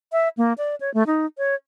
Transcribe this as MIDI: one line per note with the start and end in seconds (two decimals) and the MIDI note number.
0.12 0.29 76
0.37 0.53 58
0.58 0.75 74
0.81 0.93 73
0.94 1.03 57
1.07 1.26 63
1.38 1.55 73